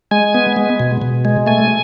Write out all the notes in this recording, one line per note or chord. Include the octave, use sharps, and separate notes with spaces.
G#3 G#5
B3
G#3
B2
B2
G#3
A3 G#5